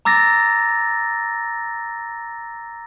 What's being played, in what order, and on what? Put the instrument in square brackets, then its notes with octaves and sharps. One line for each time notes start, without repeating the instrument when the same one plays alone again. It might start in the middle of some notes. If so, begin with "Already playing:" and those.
[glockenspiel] A#5 D6 E6 A6 A#6